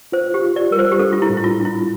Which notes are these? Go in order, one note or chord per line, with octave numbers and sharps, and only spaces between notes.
F4 C5
G4
F4
D5
G3 A#4
C5
G4
D4 A4
F4
E4
A2
E4
F4
D4
E4